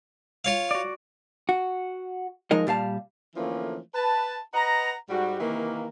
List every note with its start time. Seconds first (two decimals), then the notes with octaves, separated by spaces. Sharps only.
0.45 F4 C#5 F5
0.71 F#4 D5
1.49 F#4
2.51 F3 G#3 D#4 A#4 D#5
2.67 A#2 G3 F5 A5
3.36 D3 E3 F3 A3 A#3 C#4
3.95 B4 A5
4.54 B4 D#5 F#5 A#5
5.10 G#2 G3 F#4
5.40 C3 D#3 E3 A#3